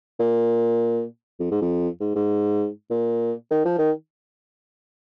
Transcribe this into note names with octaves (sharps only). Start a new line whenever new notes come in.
A#2
F2
G#2
F2
G#2
G#2
A#2
D#3
F3
D#3